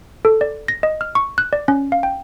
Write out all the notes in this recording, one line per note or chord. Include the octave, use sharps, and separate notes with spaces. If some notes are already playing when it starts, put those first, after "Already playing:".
A4
D5
A#6
D#5
F6
C#6
F#6
D5
C#4
F5
G5